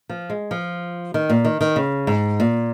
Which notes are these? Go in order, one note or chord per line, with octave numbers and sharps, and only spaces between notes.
F3
G#3
F3
D#3
A#2
D#3
D#3
C#3
G#2
A#2